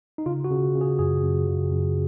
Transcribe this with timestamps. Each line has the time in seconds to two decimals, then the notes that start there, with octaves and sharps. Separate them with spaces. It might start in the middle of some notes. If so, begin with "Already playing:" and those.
0.18 D#4
0.26 C#3 F4
0.44 F#4
0.51 C#3
0.75 C#3
0.81 G#4
0.99 F#2 G#4
1.23 F#2
1.47 C#3
1.72 F#2